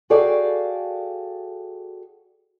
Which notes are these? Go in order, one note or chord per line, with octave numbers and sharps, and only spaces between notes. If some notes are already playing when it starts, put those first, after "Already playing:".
F#4 G#4 A4 D5 F5 G5